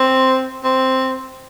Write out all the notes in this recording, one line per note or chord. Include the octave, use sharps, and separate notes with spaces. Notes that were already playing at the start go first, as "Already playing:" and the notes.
Already playing: C4
C4